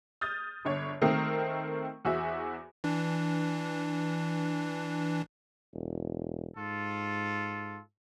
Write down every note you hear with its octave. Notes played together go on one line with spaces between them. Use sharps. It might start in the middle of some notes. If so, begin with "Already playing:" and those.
D#6 F6 G6 A6
G1 D3 C#5
D#3 A3 C4 A#4 D#6
E2 F#4 G#4 C5 E5
E3 D4
E1
G#2 F4 A4